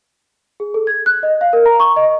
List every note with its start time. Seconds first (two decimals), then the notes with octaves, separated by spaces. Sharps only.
0.60 G#4
0.74 A4
0.87 G#6
1.06 F#6
1.23 D#5
1.41 F5
1.53 A#4
1.66 A#5
1.80 C#6
1.96 D#5